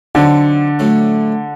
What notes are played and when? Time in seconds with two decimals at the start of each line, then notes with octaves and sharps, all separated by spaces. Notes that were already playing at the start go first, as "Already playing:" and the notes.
0.15 D3 F#3 C4 D#4
0.79 A2 F#3 A3